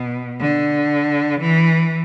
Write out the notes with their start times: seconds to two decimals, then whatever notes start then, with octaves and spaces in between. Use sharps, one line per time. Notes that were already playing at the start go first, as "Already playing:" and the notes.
Already playing: B2
0.41 D3
1.41 E3